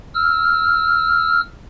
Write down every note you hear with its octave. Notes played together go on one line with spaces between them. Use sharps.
E6 F6